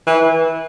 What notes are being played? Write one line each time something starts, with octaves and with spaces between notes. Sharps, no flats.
E3